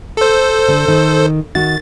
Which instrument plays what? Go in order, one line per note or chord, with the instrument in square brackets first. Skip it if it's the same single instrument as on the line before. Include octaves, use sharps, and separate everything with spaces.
[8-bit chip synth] A4 C5
[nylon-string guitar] D3
D#3
[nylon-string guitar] D#3 F#4 [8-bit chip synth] A6